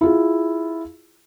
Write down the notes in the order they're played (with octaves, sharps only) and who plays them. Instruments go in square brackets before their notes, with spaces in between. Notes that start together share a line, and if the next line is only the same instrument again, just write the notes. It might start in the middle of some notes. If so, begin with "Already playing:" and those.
[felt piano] E4 F4 G#4